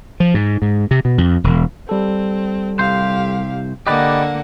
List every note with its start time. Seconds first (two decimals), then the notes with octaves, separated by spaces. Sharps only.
0.20 F3
0.34 G#2
0.62 G#2
0.91 C3
1.05 B2
1.18 F2
1.44 E1
1.89 G3 C4 A4
2.79 C2 G4 C5 F5
3.87 D3 A#3 G4 B4 D5 D#5 F#5